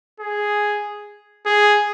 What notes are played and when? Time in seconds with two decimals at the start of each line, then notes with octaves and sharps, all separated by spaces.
0.20 G#4
1.46 G#4